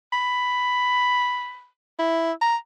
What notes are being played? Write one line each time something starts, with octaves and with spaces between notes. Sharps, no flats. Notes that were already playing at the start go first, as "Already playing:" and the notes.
B5
E4
A#5